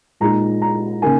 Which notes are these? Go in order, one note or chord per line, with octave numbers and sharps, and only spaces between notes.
A#2 G#3 D#4 A#5
A#5
C#3 A#3 D#4 G#5